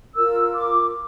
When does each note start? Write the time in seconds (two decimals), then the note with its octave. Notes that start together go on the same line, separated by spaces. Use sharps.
0.15 F4 A#4 E6
0.55 D6